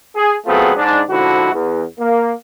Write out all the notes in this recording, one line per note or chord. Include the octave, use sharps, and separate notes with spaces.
G#4
F#3 A3 B3 C4 F4 G#4
G#2 D4
G#2 D3 F3 E4 F#4
E2
A#3